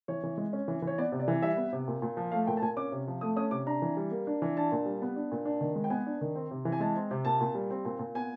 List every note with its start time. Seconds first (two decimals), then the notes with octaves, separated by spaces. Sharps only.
0.08 E3 C#5
0.24 E3
0.38 G#3
0.53 C#4
0.68 E3
0.82 E3
0.87 C#5
0.98 B3 D5
1.12 C3
1.20 D5
1.28 E3
1.42 G3 E5
1.57 B3
1.72 C3
1.88 A#2
2.02 A#2
2.17 F3
2.32 A3 F5
2.47 A#2 G5
2.57 A5
2.62 A#2 G#5
2.77 C#4 D6
2.92 C3
3.08 F3
3.21 A3 D#6
3.36 C#4 D#6
3.51 C3 D6
3.66 D4 A#5
3.82 E3
3.97 G3
4.11 A#3
4.27 D4
4.42 E3
4.57 D4 A5
4.72 A#2
4.86 G3
5.02 B3
5.16 D4
5.32 A#2
5.45 D4
5.61 D#3
5.76 G#3
5.84 G5
5.90 B3 G#5
6.06 D4
6.21 D#3
6.35 C4
6.51 C3
6.65 E3
6.72 G#5
6.80 G#3 A5
6.96 C4
7.11 C3
7.25 A#2 A5
7.41 A#2
7.55 G3
7.70 C4
7.85 A#2
7.99 A#2
8.15 B3 G#5